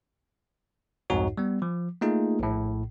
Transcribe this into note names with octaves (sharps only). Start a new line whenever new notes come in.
C2 F2 G#2 D#4 F#4 C#5
G3 B3
F3
A3 A#3 D#4 F4 G#4
A#1 A2